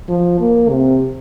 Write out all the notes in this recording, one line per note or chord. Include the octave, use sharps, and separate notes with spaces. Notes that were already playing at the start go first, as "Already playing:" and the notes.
F3
A#3
C3